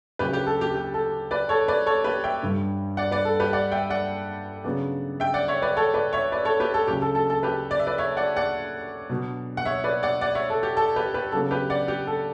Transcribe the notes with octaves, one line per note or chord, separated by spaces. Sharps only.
D2 C#3 F#3 G4 B4
G4 B4
A4
G4
G4
A4
B4 D5
A4 C#5
B4 D5
A4 C#5
G4 B4
E5 G5
G2 D3 G3
D5 F#5
B4 D5
A4
G4 B4
D5 F#5
E5 G5
D5 F#5
C#3 F#3 B3 D4
E5 G5
D5 F#5
C#5 E5
B4 D5
A4 C#5
B4 D5
C#5 E5
B4 D5
A4 C#5
G4 B4
A4
D2 C#3 F#3 G4
A4
A4
A4
G4 B4
D5
E5
B4 D5
C#5 E5
D5 F#5
D5 F#5
B2 F#3 B3 D4
F#5
C#5 E5
B4 D5
D5 F#5
D5 F#5
C#5 E5
A4
G4
A4
G4 B4
G4 B4
C#3 F#3 B3 D4 A4
G4 B4
D5 F#5
G4
A4